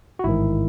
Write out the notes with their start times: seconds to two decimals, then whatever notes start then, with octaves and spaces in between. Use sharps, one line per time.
0.19 F#4
0.24 A1 G#2 D#3 E4